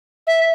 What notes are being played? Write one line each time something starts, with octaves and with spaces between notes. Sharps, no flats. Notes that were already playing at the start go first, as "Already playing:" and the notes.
E5